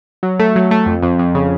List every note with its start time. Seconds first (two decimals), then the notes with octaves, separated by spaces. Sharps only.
0.23 F#3
0.40 A3
0.56 F#3
0.71 A3
0.86 F2
1.02 F2
1.19 F2
1.35 C#3